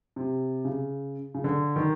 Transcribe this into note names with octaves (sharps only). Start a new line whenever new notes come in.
C3
C#3
C#3
D3
D#3